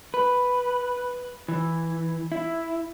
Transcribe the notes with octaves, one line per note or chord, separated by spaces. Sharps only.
B4
E3
E4